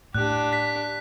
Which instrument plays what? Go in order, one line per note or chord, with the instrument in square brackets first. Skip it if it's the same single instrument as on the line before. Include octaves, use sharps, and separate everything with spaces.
[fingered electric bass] A2 [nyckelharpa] D4 G4 [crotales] F#6
[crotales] B6